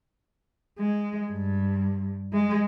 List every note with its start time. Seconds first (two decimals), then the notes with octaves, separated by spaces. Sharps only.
0.79 G#3
1.31 G2
2.33 G#3